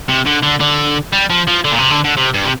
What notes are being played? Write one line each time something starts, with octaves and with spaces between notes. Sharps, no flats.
C3
D3
D3
D3
G3
F3
F3
D3
A#2
C3
D3
D3
C3
G2
C3